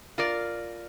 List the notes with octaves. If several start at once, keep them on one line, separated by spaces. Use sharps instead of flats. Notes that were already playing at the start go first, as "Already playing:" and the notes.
F4 A#4 D5